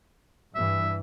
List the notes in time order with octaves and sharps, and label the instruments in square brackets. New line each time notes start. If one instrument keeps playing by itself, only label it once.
[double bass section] G2 E3 [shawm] E5